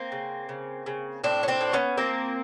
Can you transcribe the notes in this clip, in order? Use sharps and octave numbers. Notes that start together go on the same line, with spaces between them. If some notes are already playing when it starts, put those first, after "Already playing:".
Already playing: A#3 C4
C#3
C#3
C#3
A2 C4 D4
C#4
C4 D4
A2
B3 C#4
F3 A#3 C4